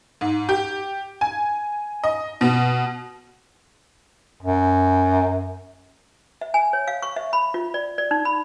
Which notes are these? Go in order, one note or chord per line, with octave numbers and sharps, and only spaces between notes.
G#2
G4
G#5
D#5
B2
F#2
E5
G#5
C#5
F5
C#6
E5
B5
F4
D5
D5
D#4
B5